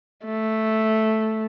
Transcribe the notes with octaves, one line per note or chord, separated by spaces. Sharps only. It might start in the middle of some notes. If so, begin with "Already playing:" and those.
A3